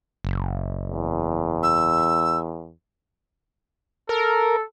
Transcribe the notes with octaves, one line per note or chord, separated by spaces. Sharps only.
F#1
E2
E6
A4 A#4